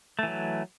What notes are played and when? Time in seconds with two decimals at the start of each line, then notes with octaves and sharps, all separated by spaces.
0.19 A3
0.23 E3
0.28 F#3